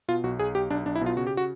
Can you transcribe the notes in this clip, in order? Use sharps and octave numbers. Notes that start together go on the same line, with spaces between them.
B2 F4
B1 F#4
B1 G#4
B1 G4
B1 D4
B1 D4
E4
B2
F4
C#3 F#4
G4
F#4